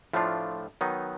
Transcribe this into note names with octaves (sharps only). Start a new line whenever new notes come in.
A2 F3 A3 D4 F4
D#3 F#3 B3 D#4